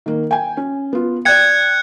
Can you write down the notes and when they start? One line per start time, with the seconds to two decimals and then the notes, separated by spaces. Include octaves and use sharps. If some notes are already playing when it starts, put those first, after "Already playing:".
0.06 D#3 A#3
0.31 G5 G#5
0.57 C#4
0.93 B3 F4
1.25 D5 G5 F#6 G#6 C#7